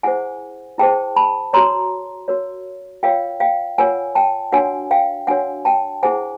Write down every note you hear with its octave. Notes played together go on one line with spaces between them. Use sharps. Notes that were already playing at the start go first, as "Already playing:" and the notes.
E4 G#4 C5 F#5 G#5
E4 G#4 C5 G5 A5
A5 B5
F#4 A#4 C#5 A#5 C6
F#4 A#4 C#5
F4 A#4 C#5 F5 G5
F5 G5
F4 A#4 C#5 F#5 G#5
G5 A5
D4 F#4 A#4 C#5 F#5 G#5
F5 G5
D4 F#4 A#4 C#5 F#5 G#5
G5 A5
E4 G#4 C5 F#5 G#5